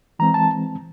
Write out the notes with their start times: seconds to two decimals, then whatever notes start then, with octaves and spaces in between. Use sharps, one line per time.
0.19 E3 G#3 C4 A#5
0.34 A5